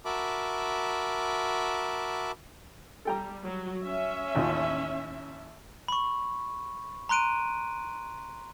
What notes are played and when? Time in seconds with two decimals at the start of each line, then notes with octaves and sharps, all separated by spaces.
0.05 F#4 A#4 E5 A5 B5 D6
3.05 G3 A4 G5 A#5
3.43 F#3
3.82 C#4 E5
4.35 A1 D#2 F4
5.88 B5 C#6
7.09 A#5 C6 F#6 D7 D#7